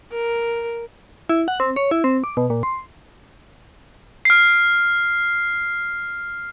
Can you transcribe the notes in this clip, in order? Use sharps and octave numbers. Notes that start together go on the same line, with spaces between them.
A#4
E4
F#5
C4
C#5
E4
C4
D6
B2
A#2
C6
F6 C7